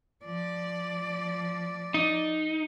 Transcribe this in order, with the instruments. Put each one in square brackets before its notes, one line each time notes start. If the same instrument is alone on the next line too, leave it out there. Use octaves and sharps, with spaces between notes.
[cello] F3 D5
[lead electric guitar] D#4